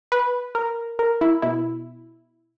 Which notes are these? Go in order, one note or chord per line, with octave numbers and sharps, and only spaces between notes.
B4
A#4
A#4
E4
B2 E4